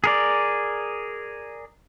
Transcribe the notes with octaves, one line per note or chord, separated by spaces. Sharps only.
G#4 A#4 D5